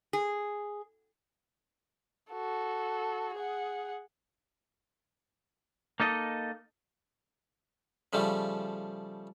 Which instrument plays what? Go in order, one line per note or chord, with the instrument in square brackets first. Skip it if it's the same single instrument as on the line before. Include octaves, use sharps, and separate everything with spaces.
[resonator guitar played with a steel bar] G#4
[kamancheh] F#4 A4
G#4 F#5
[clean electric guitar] A#3 D#4 A4 D#5
[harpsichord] C#3 F3 G3 A3